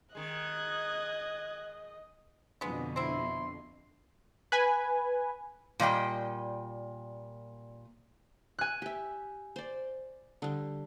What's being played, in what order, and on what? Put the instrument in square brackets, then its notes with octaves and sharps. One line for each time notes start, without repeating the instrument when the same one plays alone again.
[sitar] D#3 G#3 [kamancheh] D#5 [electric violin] F#6 G#6
[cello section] F2 B2 D3 [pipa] G#3 B3
[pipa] C4 E4 [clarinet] C6
[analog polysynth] B4 G#5
[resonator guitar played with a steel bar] A#2 G3 D#5 G5
[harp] G#5 F#6
[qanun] G4 E5
C5 D5
D3 G3